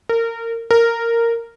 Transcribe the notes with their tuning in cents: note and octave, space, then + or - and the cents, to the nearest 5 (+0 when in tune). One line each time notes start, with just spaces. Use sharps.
A#4 -25
A#4 -10